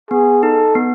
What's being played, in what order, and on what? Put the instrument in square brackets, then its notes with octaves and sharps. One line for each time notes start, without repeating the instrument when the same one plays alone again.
[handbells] B3 [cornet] G#4
[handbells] D#4 [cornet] A4
[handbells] B3